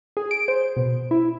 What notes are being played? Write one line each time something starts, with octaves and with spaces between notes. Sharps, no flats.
G#4
D7
C5
B2
E4